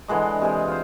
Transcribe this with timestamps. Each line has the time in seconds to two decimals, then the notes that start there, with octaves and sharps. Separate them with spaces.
0.08 D3 E3 G#3 D#5
0.42 C3 G#3
0.68 F4 C5